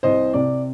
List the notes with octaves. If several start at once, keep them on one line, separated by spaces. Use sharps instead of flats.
C2 C5 D#5
C3 D5